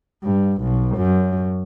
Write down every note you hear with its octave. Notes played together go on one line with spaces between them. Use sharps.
G2
B1
F#2